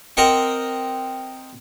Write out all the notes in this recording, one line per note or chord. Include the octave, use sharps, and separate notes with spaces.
C4 A#4 D#5 F#5